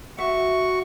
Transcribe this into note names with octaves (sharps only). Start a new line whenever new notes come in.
F#4 E5 C#6